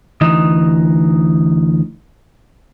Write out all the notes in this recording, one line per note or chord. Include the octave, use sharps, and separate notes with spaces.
D2 E3 D#4 D#5